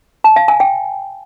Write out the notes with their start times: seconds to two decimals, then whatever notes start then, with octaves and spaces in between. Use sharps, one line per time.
0.24 A5
0.36 F5
0.48 G#5
0.60 G5